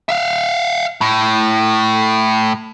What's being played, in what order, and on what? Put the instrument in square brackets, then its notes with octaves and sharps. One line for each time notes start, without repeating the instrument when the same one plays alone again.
[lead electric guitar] E5 F5
A2